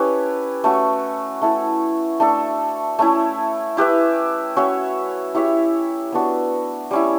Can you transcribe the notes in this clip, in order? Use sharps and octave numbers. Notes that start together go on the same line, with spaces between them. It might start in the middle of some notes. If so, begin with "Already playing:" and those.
Already playing: C#4 E4 G4 A4 B4
A3 C#4 F#4
A3 E4 A4
A3 D4 A4
A3 C#4 E4
E4 G4 B4 E5
C#4 F#4 C#5 E5
E4 G4 C#5 E5
B3 D4 F#4
G3 C#4 E4